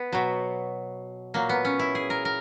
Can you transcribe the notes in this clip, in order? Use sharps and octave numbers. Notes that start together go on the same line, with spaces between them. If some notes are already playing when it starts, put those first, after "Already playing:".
Already playing: B3
B2 F#3
A#2 F#3 A#3
B3
C#4
E4
G#4
A#4
A#4